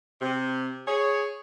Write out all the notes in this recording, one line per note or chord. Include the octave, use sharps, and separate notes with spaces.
C3
G#4 C#5